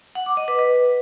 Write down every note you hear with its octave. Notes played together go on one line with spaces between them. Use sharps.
F#5
D6
D#5
B4
B4